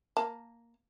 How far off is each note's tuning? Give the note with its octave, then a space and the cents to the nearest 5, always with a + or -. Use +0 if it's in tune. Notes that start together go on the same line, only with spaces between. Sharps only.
A#3 +0 A5 +20